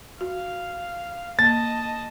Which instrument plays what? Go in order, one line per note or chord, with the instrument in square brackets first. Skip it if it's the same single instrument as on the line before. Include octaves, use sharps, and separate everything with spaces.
[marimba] F#4 [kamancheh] F5
[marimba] A#3 [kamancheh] D#5 A5 [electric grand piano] A6